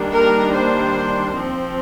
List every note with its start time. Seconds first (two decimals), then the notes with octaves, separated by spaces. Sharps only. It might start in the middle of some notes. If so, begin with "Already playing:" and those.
Already playing: D#3 G3 A#3 D4
0.14 A#4
0.54 C5
1.35 F3 C4